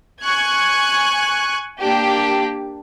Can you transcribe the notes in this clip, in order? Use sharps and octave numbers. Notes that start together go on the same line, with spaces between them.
G#5 C#6 F#6 G#6
A#3 D4 G4